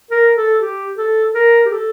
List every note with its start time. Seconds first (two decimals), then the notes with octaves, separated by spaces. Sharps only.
0.11 A#4
0.36 A4
0.60 G4
0.98 A4
1.35 A#4
1.65 G4
1.72 A4